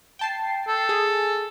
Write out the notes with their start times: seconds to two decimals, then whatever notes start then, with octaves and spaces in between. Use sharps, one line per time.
0.19 G5 A5 C7
0.68 A4
0.89 G#4